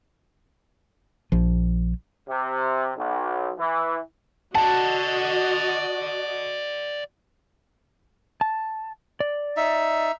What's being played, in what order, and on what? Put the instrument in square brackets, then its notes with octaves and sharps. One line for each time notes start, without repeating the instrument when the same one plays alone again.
[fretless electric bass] A#1 F3
[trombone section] C3
B1
E3
[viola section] F#4 D#5 [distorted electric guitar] D5 F#5 [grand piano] A5
[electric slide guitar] A5
D5
[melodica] D#4 E5